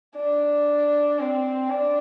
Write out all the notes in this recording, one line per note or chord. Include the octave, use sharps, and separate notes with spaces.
D4
C4
D4